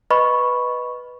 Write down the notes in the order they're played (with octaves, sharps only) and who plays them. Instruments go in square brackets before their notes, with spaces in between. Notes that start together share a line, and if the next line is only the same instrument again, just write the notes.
[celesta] B4 D#5 B5 C#6